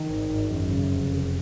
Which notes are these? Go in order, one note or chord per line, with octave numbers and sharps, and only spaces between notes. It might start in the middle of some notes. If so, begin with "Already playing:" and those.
Already playing: D#3
G#1
G#1
F#2
C#3
F1
F1